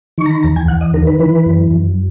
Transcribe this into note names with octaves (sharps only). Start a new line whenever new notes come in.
D#3 C#6
A#5
B5
E2 A#5
G#5
E2 F#5
D#5
D#3 A#4
B4
E3 B4
F#2
F#2